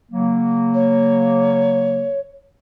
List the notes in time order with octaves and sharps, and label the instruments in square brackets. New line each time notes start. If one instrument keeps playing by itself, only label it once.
[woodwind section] C#3 F#3 A#3
[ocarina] C#5